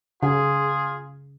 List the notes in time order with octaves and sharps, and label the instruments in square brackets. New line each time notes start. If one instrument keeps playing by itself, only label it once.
[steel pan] C#3 [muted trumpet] F4 [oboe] G#4